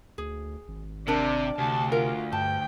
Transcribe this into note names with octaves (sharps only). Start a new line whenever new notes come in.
D2 G#4
G#1
C3 D4 A#4 D5
D2 C3 A5
F4 A#4
G2 G5 A5